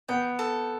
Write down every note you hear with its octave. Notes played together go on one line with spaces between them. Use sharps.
B3 G5
A4